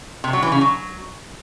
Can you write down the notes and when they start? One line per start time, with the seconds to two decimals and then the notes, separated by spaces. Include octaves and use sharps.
0.24 C3
0.33 F#3
0.42 E3
0.52 C#3
0.61 F#3